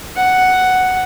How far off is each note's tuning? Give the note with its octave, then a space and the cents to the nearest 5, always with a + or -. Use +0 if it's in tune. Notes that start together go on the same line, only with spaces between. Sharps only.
F#5 +5